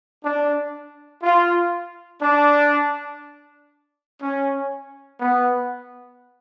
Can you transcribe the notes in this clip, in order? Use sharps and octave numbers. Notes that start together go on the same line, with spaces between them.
D4
F4
D4
C#4
B3